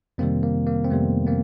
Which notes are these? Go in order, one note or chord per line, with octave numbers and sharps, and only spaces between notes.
F2 C3 D#3 G3 A#3 C4
A#3
A#3
C4
F2 C3 D#3 G3 A3 B3
A#3 C4